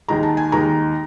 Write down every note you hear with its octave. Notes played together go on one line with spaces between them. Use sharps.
D#2 D#3 G#3 A#5
A5
G#5
D#2 D#3 G#3 A#5